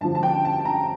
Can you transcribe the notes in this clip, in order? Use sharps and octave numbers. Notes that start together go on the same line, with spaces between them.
G2 D3 F3 A5
A5
G5
A5
A#5